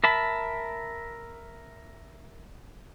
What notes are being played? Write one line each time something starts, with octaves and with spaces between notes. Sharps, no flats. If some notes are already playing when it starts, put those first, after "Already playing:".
A#4 E5 A5 B5